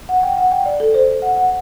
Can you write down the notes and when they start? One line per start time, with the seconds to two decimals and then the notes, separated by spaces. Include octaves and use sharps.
0.09 F#5
0.23 G5
0.37 F#5
0.52 G5
0.66 D5
0.80 A4
0.94 C5
1.22 F#5
1.36 F#5